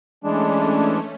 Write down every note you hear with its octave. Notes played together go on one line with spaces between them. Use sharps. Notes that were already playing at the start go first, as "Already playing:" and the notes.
E3 G#3 A3 C#4 D4